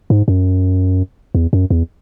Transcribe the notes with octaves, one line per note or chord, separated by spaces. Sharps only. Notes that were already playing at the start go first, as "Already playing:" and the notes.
G#2
F#2
E2
F#2
E2